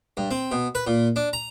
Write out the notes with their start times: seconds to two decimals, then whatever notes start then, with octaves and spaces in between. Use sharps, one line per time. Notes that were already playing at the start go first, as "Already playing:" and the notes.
0.17 G2
0.31 C4
0.51 B2
0.75 B4
0.87 A#2
1.16 D4
1.33 A#5